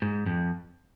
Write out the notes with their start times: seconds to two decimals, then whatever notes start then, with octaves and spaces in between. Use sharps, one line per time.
0.02 G#2
0.26 F2